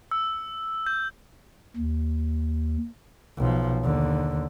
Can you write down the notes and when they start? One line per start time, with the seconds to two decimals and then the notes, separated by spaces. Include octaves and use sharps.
0.11 E6
0.87 G6
1.77 D#2
3.38 B1 F3
3.84 D#2 D3